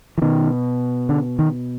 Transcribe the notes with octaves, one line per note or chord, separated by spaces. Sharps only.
E3
B2 D#3
D3
D#3